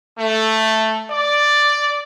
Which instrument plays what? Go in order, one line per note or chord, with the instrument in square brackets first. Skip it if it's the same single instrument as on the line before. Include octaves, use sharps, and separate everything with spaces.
[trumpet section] A3
D5